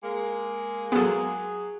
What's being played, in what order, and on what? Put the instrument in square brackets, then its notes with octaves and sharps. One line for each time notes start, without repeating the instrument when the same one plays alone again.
[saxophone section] G#3 A#3
[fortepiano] F#3 G#4 [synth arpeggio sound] B3 A4